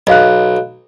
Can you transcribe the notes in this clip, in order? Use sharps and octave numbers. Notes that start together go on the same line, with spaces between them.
B1 D#5 F5 F#6